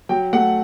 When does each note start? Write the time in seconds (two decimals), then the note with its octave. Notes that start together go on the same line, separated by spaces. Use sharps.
0.09 F#3 G5
0.33 A3 F#5